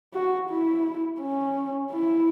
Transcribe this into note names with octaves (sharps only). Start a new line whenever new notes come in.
F#4
E4
C#4
E4